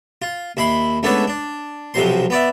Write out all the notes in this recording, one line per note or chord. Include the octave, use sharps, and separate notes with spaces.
F4
D#2 E4 B5 C6
C#2 A3 B3 D4 A4 C#5
D4
B1 F2 C3 F#3 C5 C6
B3 D5 E5